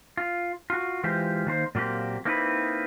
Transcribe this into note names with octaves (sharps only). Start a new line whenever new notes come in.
F4
F4 F#4
E3 G#3 F4 G4 C5
D#3 A#3 C5
A#2 F#3 A#3 C4 G4
A#3 C4 D#4 E4 F#4 B4